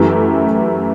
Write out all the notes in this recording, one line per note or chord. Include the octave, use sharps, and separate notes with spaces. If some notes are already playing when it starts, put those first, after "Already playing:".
Already playing: F#2 E3 A3 E4 G4